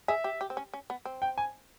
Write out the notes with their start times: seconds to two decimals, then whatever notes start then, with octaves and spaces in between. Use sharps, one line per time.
0.08 G#4 E5
0.24 G4
0.41 G4
0.50 C4
0.57 C#4
0.73 C#4
0.90 B3
1.05 C4
1.22 G5
1.38 G#5